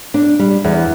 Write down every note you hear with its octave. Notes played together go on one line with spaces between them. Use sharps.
D4
G3
E2